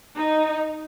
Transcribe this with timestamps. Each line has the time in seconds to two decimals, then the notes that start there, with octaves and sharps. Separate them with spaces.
0.16 D#4